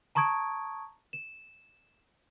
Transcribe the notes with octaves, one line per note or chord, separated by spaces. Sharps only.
A5 A#5 C#6 D#6 G#6 D7
E7